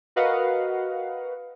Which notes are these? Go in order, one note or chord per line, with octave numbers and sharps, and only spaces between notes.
F#4 A#4 B4 D#5 F5 F#5